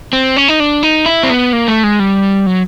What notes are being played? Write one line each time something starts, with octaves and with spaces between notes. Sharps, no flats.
C4
C#4
D#4
D4
D#4
E4
C4
B3
A#3
A3
G#3
G3
F#3